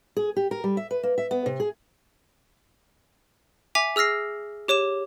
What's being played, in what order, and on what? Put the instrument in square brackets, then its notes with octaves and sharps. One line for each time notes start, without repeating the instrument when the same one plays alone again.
[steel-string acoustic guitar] G#4
G4
A#4
G3
E5
B4
A#3
E5
B3
C3
G#4
[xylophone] E5 G#5 D6 B6 F7
G#4 E6 F6 A#6 C7
G4 C#5 D6 E7